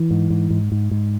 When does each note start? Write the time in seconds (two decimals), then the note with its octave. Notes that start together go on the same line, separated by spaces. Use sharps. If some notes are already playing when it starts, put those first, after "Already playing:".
Already playing: E3
0.11 G#2
0.30 G#2
0.51 G#2
0.72 G#2
0.91 G#2